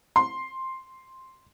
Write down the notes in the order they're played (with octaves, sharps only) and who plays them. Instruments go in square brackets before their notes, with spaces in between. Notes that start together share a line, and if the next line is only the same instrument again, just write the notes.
[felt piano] C6